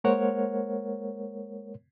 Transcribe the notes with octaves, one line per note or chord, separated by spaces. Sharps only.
G#3 A#3 A#4 C5 C#5 F#5